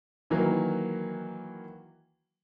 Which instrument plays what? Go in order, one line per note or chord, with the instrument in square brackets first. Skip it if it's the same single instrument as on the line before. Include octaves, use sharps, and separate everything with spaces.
[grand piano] D#3 E3 F#3 A#3